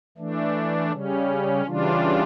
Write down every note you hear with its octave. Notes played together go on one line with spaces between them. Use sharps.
E3 A3 D4
C#3 G3 C#4
C#3 E3 G3 D4 F4